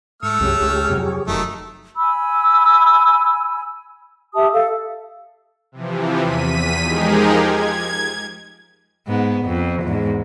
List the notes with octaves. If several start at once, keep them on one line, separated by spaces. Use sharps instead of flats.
G#2 A3 C#6 E6 F6
C2 F#2 G4 G#4 C#5
C#2
F2 C3 F#3
F1 F#2 D#3 F#3 A3
G#5 B5 E6
G4 E5 A5 D#6
A4 F5
C3 E3 F3
E2 B6 D#7
F3 G#3 D#4 G4 G#4 A#4
G#6
G#2 B3
F2
E2 G#2